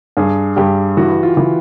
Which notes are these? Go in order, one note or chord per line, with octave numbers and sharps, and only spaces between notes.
G2 G#4
G2 G4
E3 F#4
F4
E3